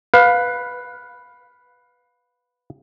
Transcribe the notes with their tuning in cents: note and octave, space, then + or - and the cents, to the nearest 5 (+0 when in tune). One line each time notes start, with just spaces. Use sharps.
B4 +0 F5 +25